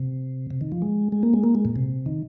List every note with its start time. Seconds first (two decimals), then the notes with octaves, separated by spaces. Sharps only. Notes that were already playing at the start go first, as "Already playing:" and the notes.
Already playing: C3
0.51 C3
0.61 D#3
0.72 F3
0.82 G#3
1.12 G#3
1.23 A#3
1.34 G#3
1.44 A#3
1.55 G#3
1.65 A#2
1.76 C3
2.06 D#3